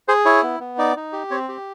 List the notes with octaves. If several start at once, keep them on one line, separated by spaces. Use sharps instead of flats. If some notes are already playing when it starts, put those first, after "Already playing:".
G#4 C5
E4 C#5
B3
B3
D#4 D5
D#4
G4
C4 C#5
G4